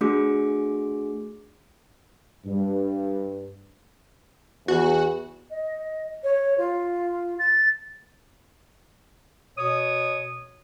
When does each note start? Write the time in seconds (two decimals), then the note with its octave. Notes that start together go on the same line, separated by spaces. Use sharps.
0.01 A3 D4 F#4 G#4 D6
2.45 G2
4.68 E2 F#4
5.51 D#5
6.24 C#5
6.58 F4
7.39 A6
9.57 B2 C#5 D#6